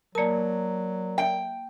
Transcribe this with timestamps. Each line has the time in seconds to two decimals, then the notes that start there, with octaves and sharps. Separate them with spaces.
0.15 F#3 A#3 A#4 D5 A5
1.18 G5